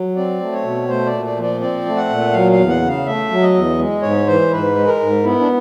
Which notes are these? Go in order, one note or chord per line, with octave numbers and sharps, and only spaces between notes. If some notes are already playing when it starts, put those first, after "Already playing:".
Already playing: F#3
C4 D5
A3
C#5
B2
A3 C5
D5
A#2
D5
F3
D5
C4 D5
A3
F#5
A#2
F#3 F5
F5
E2
F#5
C#3
F5
A3 E5
F#3
D#5
E2
G#3
G#2 C#5
E3 C5
G#2 B4
G#3
A#4
G#2
B3 E4
D4